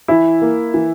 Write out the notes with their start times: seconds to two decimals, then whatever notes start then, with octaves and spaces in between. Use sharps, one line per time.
0.08 E3 E4
0.42 A#3
0.74 E3